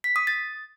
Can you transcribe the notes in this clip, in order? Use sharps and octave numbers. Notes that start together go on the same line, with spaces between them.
B6
D#6
A6